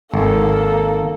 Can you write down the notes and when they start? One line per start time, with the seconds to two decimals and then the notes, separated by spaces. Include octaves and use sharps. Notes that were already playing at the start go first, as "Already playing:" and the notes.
0.14 G#1 A#3 A4